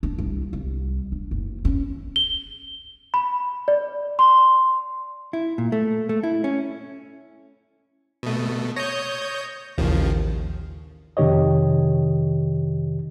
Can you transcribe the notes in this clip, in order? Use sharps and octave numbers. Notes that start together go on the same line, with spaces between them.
D4
C2
C2
D4
F#1
C#4
G7
B5
D5
C6
E4
A#2
A3
A3
E4
C#4
B2 A3 D#6
C#5 D#6 G6 A#6
A1 D#2 C#3 F3
F2 C3 D#3 G4 C#5 D#5